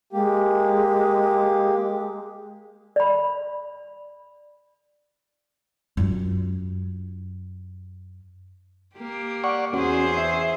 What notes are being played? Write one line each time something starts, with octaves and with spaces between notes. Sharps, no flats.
G#3 A#3 G4
D5 B5
F#2 F4
A#3 G4
D5 F#5 C#6
E2 C#4 F#4 G#4 C5
E5